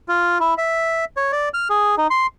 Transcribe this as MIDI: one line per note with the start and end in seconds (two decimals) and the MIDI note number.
0.08 0.38 65
0.40 0.54 64
0.58 1.05 76
1.17 1.32 73
1.32 1.49 74
1.54 1.68 89
1.70 1.95 68
1.98 2.07 63
2.11 2.27 84